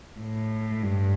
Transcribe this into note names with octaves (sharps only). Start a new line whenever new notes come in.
A2
G2